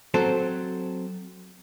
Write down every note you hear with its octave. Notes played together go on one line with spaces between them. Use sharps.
F#3 C4 A4 C5